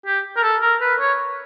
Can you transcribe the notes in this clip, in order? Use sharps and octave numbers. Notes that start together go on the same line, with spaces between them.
G4
A#4
A4
A#4
B4
C#5